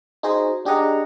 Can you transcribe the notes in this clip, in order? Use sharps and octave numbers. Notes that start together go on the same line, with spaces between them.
D#4 F#4 G#4 C5 D#5
D4 G4 G#4 D#5 F#5 A#5